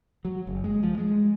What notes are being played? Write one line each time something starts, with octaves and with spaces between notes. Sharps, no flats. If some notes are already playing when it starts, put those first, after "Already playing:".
F#3
F#1
G#3
F3
G#3